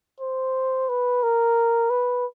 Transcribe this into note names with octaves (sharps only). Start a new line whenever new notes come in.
C5
B4
A#4
B4